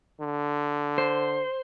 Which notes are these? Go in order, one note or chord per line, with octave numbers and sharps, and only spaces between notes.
D3
C5